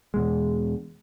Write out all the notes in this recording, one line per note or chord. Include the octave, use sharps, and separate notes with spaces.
E2 B2 G#3